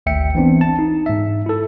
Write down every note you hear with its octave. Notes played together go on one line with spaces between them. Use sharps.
G#1 D2 E5 G5 C#7
E3 B3 C4 D4
A5
D#4
G#2 E5
E4 A4